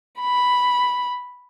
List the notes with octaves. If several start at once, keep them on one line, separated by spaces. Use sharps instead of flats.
B5